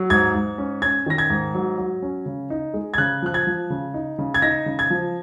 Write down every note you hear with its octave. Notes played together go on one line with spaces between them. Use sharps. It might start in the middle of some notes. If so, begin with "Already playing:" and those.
Already playing: F#3
G#2 G#6
G#2
C#4
C#4 G#6
D#3 A#6
G#6
G#2
F#3
F#3
C#4
C#3
D#4
G#3
G#6
C#3 F#6
F3 F#6
G#6
F3
C#3
D#4
C#3
G#6
D#4 A#6
C#3
G#6
F3